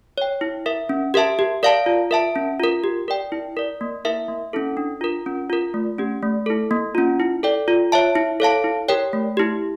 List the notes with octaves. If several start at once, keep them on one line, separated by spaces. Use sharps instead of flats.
C#5 G5
E4
A#4 E5
C#4
G4 A#4 E5 A5
G4
A#4 D5 F5 A5
F4
A#4 E5 A5
C#4
F4 A#4
G4
A#4 D5 G5
E4
A#4 D5
A#3
E4 A#4 E5
A#3
C#4 E4 A4
D4
F4 A#4
C#4
F4 A#4
A3
C#4 G4
A3
E4 A4
A#3
C#4 F4
E4
A4 D5 G5
F4
C#5 E5 A5
E4
A4 C#5 F5 A5
E4
G4 A#4 C#5 G5
A3
E4 G4